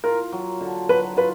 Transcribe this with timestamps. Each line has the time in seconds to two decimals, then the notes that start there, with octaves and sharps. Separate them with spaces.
0.04 F4 A#4
0.32 F#3
0.61 D3
0.89 F#3 B4
1.17 F4 B4